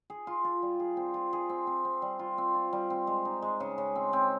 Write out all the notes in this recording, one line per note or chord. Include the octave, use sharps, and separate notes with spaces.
G#4
F4
F4
G3
G#4
C4
F4
G#4
C4
C4
C4
G3
F4
C4
F4
G3
C4
G#3
D#4
G#3
C#3
C#3
C4
C4